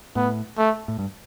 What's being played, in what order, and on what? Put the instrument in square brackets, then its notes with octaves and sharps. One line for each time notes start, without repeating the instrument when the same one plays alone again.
[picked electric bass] A2 [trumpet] B3
[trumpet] A3
[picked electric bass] A2
G2